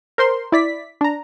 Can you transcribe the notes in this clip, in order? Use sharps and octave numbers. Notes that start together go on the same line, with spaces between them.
A#4 C5 C6
E4 D5 B6
D4 A#5